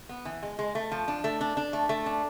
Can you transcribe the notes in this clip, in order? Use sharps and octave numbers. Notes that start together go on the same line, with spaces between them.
B3
E3
G#3
G#3
A3
F3
D4
A3
D4
D4
A3
A3
D4